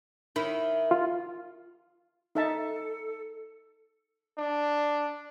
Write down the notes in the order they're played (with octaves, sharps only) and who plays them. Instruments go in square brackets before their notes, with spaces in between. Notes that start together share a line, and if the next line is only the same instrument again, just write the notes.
[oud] D#3 E4
[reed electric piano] F4
[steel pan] D#4 E5 A5 [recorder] A4
[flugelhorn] D4